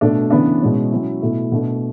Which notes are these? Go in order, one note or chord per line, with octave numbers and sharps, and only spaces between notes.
B2 A3 D4
C#3 E3 B3 D4
B2 G#3 C#4 E4
F#3 C#4 E4
B2 A3 E4
B2 A3 D4